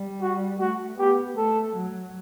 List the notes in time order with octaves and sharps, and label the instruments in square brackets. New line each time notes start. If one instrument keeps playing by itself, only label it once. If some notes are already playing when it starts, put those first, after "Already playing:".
Already playing: [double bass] G3
[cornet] F#4
[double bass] A3 [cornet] F#4
[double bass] B3 [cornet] G4
[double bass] A3 [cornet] A4
[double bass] F#3